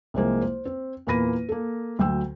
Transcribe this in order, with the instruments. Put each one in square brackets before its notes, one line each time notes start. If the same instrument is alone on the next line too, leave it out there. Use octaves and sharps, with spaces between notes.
[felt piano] C2 F3 G#3 A#3 C5
C5
C4
E2 A#2 A#3 B5 A#6 D#7
A#3 A4
D2 F#3 G5 E6